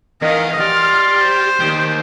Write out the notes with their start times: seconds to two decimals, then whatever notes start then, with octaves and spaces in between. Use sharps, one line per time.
0.22 E2 D#3 D#5 F5
0.60 G4 D5 C6 F6
1.21 C5
1.60 D#2 D#3 G4